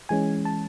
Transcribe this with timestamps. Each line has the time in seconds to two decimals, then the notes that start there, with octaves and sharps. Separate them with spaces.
0.09 E3 G#3 C#4 G#5
0.45 A5